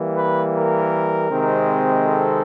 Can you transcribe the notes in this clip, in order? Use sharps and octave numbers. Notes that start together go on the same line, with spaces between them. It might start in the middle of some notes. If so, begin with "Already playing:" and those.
Already playing: E3 G3 A#3
B4
A#4
C3 D#3 G#3 C4
A4